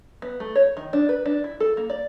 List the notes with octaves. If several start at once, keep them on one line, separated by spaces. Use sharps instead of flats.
B3
A3
C#5
D#3
D4
B4
D4
E4
A4
A#3
D5